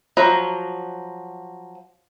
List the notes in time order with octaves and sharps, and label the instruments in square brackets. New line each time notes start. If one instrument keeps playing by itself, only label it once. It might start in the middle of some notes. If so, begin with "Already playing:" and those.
[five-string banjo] F3 F#3 A#5